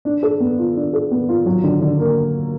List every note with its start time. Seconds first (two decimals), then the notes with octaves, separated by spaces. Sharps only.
0.05 D4
0.23 A4
0.40 B3
0.58 F4
0.76 D4
0.93 A4
1.11 B3
1.29 F4
1.46 F#3
1.64 D3
1.82 D3
1.99 A#3